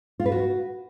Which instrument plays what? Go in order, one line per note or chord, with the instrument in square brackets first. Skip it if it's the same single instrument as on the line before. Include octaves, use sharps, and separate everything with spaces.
[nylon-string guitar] F4
B4
F#4